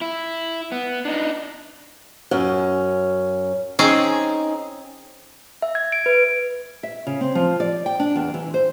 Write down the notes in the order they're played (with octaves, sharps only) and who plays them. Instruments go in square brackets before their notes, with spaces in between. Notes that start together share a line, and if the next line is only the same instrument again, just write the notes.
[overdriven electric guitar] E4
B3
D4 D#4
[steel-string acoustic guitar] F#2 C#4
[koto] C4 C#4 G#4 [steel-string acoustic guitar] D#4
[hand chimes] E5
G#6
D7
B4
[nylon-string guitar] E5
C#3
C4
F3
D5
G5
D4
E2
E3
C5